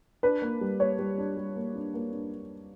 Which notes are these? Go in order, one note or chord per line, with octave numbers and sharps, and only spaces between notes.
D4 B4
A#3
G3
A#3 C#5
G3
D4
G3
A#3
D4
A#3
D4